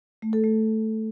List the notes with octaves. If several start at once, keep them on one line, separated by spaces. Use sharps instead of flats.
A3
A4
A3